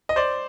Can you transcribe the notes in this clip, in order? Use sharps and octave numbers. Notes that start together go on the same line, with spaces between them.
D#5
C5 D5